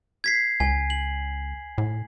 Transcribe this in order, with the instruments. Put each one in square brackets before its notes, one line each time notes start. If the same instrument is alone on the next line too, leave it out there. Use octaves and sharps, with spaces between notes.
[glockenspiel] G#6 B6 C7
[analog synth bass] C#2 [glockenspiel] G#5
[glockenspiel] F#7
[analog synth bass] A2